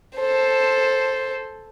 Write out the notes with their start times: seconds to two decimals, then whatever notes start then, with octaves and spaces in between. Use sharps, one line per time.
0.16 A4 C5